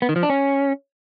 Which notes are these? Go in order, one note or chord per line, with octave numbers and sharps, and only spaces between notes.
B3
D#3
F3
D4
C#4